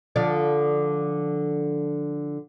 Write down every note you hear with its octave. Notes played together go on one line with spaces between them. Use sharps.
D3 F3 D5